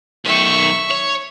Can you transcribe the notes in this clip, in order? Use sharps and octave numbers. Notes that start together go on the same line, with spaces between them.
B1 D#3 E5 C#6
C#5